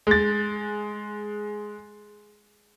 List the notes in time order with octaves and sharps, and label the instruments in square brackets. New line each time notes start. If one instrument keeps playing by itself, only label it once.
[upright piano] G#3 A6